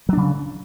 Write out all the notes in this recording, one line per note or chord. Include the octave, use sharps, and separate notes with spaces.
C#3 F#3 D4